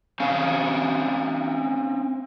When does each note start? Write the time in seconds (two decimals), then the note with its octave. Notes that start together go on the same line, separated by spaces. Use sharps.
0.20 C4 C#4 F5 G#5